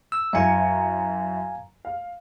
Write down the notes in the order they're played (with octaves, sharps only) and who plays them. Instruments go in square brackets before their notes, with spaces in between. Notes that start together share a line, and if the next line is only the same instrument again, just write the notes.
[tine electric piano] E6
[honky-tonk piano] F#2 E4 C#7 [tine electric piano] F5 G#5 A#5
[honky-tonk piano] F5